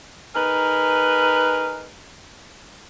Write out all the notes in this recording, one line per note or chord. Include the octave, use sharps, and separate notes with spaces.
D#4 G#4 A#4 B4